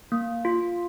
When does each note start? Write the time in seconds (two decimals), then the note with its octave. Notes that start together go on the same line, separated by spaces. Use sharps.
0.12 A#3
0.45 F4